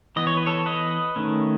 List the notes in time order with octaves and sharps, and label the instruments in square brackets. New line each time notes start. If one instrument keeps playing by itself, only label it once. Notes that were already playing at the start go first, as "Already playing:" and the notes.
[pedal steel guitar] E3 B3 D#5
C#5
B4
A4 C#5
B4 D#5
D#3 A3 C#4